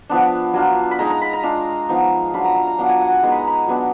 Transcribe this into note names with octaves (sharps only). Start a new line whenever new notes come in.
F3 B3 D4
F#3 D4 F4
B5
G#3 D#4 A#5
A#5
B5
A#5
G#3 D4 F4
F3 B3 D#4
F#3 D4 F4 B5
A#5
A#5
A#5
F#3 B3 D4 F4 A#5
G#5
F#5
G#5
G#3 B3 D#4
B5
A#5
B5
F#3 B3 D4